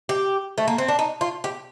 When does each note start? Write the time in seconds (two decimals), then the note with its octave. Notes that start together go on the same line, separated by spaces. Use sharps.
0.09 G4
0.58 A3
0.68 A#3
0.78 C4
0.88 D4
0.99 D#4
1.21 F4
1.44 G4